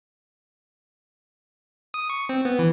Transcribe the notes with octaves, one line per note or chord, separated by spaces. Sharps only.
D#6
C#6
C4
B3
E3